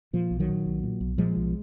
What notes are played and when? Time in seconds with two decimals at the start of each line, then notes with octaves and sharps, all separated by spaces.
0.13 A#2 F3
0.31 B1
0.40 D#3 F#3
0.49 A#2
0.66 B1
0.83 A#2
1.01 B1
1.18 A#2 F3 G#3
1.36 B1